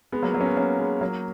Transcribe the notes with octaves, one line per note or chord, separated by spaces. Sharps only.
G#3 B3
F#3 A#3
F#3 A#3
C#4
G#3 B3
A#3 C#4
G#3 B3
F#3 A#3